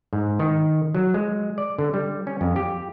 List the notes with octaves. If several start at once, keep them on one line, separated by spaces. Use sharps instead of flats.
G#2
D#3
F#3
G#3
D5
D3
G3
C#4
F2
G4